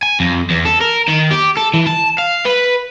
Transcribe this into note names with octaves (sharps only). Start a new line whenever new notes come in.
G#5
F2
E2
A4
A#4
D#3
G4
A4
E3
A5
F5
B4